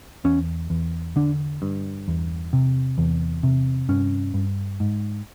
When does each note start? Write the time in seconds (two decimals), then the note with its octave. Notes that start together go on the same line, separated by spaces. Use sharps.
0.25 E2 C#4
0.70 E2
1.16 D3 D4
1.62 G2
2.08 E2
2.53 C3
2.98 E2
3.43 C3
3.89 G2 C#4
4.34 G2
4.80 G#2